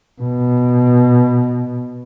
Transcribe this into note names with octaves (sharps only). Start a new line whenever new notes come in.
B2